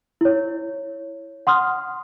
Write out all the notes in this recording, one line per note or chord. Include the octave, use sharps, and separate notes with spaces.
E4 C#5
F#5 C6 D#6 F6